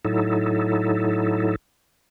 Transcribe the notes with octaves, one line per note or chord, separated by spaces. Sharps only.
A2 F#3 D#4 E4 A4